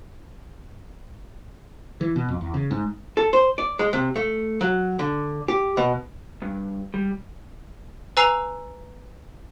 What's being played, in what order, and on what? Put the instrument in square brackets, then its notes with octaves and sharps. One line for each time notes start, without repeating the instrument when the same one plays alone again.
[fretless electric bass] E3
B2
F2
E2
C#3
G#2
[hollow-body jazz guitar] A4
C5
D5
G#3
C3
A3
F#3
D3
G4
B2
[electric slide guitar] G2
G3
[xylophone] B4 G#5 A#5 E6 C7 F7